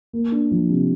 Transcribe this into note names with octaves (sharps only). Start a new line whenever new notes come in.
A#3
D4
F3
C3